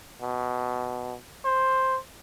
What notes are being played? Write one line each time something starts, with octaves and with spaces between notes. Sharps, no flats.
B2
C5